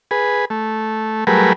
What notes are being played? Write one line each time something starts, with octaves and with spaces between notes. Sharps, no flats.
G#4 B4
A3
F#3 G3 A3 G#4 A#4 B4